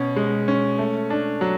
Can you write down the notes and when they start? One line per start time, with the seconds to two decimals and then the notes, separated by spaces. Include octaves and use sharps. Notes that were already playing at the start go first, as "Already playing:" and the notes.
Already playing: B2 C#4
0.16 G#3
0.48 C#4
0.79 A3
1.10 D4
1.41 F#3